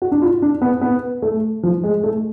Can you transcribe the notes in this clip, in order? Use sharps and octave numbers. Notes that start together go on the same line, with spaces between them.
F#4
D4
F4
D4
B3
B3
A3
F3
G#3
A3